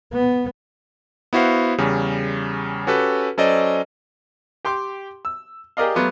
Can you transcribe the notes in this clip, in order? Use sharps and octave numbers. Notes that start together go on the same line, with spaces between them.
B3
B3 E4 F#4 C5 F5
E2 C#3 G3
C#4 F#4 G4 A4 B4
F#3 C#4 A4 C5 D5 D#5
G4 G5 C6 D6
E6
G4 G#4 A#4 D5 D#5 F5
F#3 A3 B3 F4 G4